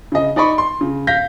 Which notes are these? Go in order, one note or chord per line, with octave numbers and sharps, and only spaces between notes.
C#3 D#5
D#4 D5 D#5 B5 C#6
C6
C#3
F5 G6 A#6 B6